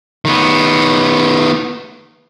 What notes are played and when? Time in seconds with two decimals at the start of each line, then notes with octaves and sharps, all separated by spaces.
0.25 D#3 B3